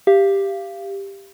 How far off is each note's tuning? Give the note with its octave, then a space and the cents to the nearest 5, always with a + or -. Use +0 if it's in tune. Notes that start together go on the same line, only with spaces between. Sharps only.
G4 +5 F5 -25